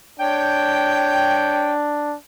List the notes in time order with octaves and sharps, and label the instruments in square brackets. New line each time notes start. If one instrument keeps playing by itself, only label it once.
[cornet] D4 [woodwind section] C#5 G5